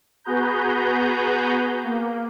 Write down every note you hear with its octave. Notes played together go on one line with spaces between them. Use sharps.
B3 F#4 G#4 B4 A#5 G6
A#3